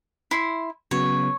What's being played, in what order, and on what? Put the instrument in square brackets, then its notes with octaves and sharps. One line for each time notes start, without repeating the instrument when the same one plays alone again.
[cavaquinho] E4 C6
[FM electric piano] C#3 F#3 B3 [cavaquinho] C#5